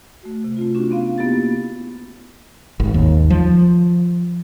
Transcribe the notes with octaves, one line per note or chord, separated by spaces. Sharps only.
A3 F#4
C3
A3 C4 F4
C#4 D4 F#4
B3 C4 F5
A#3 B3 E4 G4 A6
G#1
D#2
F3